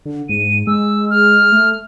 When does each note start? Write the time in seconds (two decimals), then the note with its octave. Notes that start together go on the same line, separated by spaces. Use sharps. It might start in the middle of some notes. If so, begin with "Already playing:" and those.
0.06 D3
0.29 G#2 D#7
0.67 G#3 E6
1.10 F6
1.52 A3